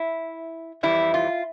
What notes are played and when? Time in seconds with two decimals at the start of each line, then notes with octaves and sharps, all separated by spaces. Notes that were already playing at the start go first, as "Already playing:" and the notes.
Already playing: E4
0.83 F2 E3 G3 E4
1.14 F4